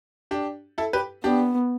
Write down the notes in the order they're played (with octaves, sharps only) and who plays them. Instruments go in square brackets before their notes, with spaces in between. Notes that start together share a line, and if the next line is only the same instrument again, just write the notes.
[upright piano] D4 G4
E4 A4
G4 B4
[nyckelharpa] B3 [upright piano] D4 G4